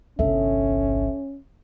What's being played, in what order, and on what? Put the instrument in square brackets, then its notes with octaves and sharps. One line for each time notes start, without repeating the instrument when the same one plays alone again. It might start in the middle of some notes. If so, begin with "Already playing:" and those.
[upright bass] G1 C2 [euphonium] C#4 [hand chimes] A4 E5